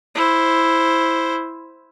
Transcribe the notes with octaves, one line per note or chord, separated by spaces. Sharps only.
E4 C5